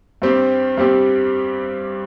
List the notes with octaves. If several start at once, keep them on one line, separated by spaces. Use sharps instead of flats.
G2 G3 C4 G4 C5
G2 G3 C4 G4 C5